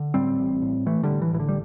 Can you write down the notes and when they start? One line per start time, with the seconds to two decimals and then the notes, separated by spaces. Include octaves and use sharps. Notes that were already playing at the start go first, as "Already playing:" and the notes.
Already playing: D3
0.14 A2 G3 C4
0.39 A1
0.62 A2
0.86 A1 E3 A3
1.03 D3 G3
1.09 A2
1.22 E3
1.33 A1 E3
1.40 D3
1.49 G3